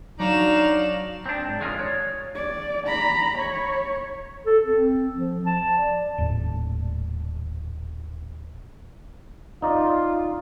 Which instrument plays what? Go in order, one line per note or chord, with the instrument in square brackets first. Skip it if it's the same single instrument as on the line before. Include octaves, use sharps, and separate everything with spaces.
[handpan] F#3 [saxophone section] D4 F#4 D5 [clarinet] D#4 [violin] F5 E7
[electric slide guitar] C4 D4
G#2
F#2 D#3 G#3 F4 A#4 D5
C#5
[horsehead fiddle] D5
A#5 B5
C#5
[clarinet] A4
C4
F3
A5
D5
[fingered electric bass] D#1 A2
[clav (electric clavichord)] D#4 D5 D#5 [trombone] F4